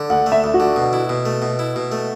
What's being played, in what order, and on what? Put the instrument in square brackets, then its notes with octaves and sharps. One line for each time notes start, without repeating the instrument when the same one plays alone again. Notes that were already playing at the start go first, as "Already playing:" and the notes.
Already playing: [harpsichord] D3
[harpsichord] D2 [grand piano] F#5
[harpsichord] A3
[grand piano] E5
[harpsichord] D2
[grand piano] F#4
[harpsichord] D3
B2
E4
B2
A3
B2
E4
B2
A3